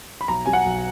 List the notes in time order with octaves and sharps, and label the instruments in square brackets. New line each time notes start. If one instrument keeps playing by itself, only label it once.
[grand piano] B5
B1 A#5
F#3 G#5
F#5
B1